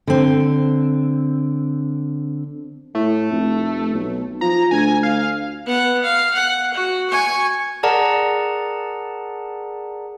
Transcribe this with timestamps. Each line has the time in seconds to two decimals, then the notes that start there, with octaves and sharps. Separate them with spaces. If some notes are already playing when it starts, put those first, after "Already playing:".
0.07 D3 C4
2.95 A2 A3
3.31 F1
3.93 B1
4.41 F3 A#5
4.71 D2 G#5
5.03 F5
5.66 B3 F#5
6.03 F5
6.34 F#5
6.74 F#4
7.10 G#5 C#6
7.83 G#4 A#4 D5 F#5 A5 A#5